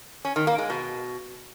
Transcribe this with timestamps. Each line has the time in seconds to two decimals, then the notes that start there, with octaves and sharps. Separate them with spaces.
0.25 C#4
0.36 D#3
0.47 A#3
0.58 G#3
0.70 B2